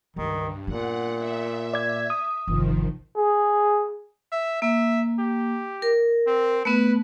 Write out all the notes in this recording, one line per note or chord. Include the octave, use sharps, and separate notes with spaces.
C#2 G2 D3 D#3
A#2 A#3 B3 F#5
E5
D5 G#6
D#6
G1 C2 D#3 F3
G#4
E5
A#3 E5
G4
A#4
C4
A3 B3 B4